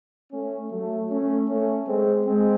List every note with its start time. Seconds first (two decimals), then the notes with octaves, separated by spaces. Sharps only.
0.32 A3 C#4
0.71 F#3 A3
1.10 A3 C#4
1.49 A3 C#4
1.87 G#3 C4
2.26 G#3 C4